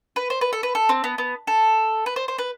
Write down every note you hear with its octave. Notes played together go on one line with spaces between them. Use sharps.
B4
C5
B4
A4
B4
A4
C4
B3
B3
A4
B4
C5
C5
B4